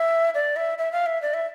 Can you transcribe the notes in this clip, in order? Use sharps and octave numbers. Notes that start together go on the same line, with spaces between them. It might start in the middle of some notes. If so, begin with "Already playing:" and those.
Already playing: E5
D5
E5
E5
F5
E5
D5
E5